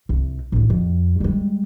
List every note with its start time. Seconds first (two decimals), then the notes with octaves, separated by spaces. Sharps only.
0.09 C2
0.52 A1 D2
0.70 F2
1.20 G3 G#3